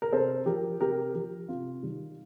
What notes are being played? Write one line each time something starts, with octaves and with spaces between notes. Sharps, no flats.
A#4
C3 A4 C5
F3 G4 A#4
C3 G4 A#4
F3 G4
C3 F4
D#3 G3